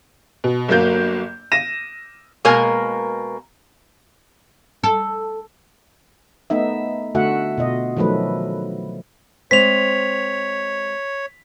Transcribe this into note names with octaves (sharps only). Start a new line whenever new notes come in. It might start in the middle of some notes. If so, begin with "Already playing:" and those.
B2
G1 F#3 A#3 G6
A#6 D#7 E7
B2 G#3 A#3 A#4 A#5
A4
A3 B3 D#4 E5
D3 A3 F#4 E5 F#5
B2 F4 D#5
D#3 F3 F#3 A3 B4
G#3 C4 C5 C#5 B6 F7